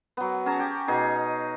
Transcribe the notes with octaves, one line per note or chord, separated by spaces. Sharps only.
F#3 B3
C#4 G#4 A5 A#5
G4
B2 D#4 G#4